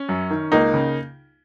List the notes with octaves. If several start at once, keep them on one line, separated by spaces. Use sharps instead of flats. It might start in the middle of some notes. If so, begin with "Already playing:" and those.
Already playing: C#4
F#2
D#3
C#2 A#3 D#4
C#3